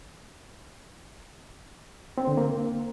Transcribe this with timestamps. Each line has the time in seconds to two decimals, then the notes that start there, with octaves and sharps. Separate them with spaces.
2.18 C4
2.27 D3
2.37 A#3